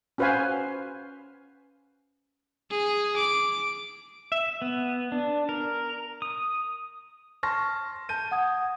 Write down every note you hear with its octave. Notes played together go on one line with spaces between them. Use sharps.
C#4 F#4 B4 C5 F5 G#5
G#4
D6
E5
B3
D4
A#4
D#6
A5 C6 C#6 F6 A#6
A5 G6 D#7
F#5 D#6 G#6